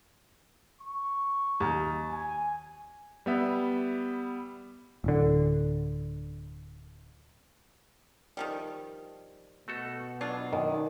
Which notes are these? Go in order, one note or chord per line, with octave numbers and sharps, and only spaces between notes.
C#6
D#2
G#5
G3 B3 E5
D1 D3
D#3 F3 G3
B2 A3 F#4 A4
F#3 D4 F4
F#2 D#3